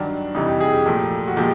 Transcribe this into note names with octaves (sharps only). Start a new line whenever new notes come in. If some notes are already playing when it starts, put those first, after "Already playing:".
Already playing: G2 D#3 F#3 D4
F2 C3 E3 G3 D#4
G4
G#4
G4
A#2 F3 A3
F#4
A#2 F3 G#3 G4